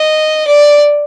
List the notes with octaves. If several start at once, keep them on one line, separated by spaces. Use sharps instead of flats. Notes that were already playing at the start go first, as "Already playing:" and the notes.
Already playing: D#5
D5